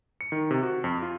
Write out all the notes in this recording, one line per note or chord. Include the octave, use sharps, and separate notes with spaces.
C#7
D#3
C3
F#4
F2
F4